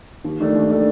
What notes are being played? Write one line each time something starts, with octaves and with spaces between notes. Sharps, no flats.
D#2
D#3 A3 D4 A4
D#2
D#3 A3 D4 A4